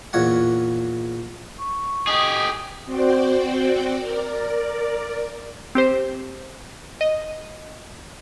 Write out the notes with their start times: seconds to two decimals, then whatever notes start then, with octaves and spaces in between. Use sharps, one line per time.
0.13 E2 A#2 C#5 F#5
1.59 C#6
2.07 G4 G#4 D#5
2.86 C4 F#4 C5 D5 G5
3.96 A#4 D5
5.75 C4 G4 C5
7.01 D#5